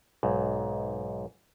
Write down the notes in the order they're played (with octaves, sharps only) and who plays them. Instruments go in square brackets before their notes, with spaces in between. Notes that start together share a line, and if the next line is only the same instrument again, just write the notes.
[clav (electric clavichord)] B1 G#2